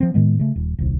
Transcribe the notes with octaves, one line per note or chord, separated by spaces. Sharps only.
F3 C4
A2 D#3 G#3 B3
C#3 A3
D#1
D#1 C2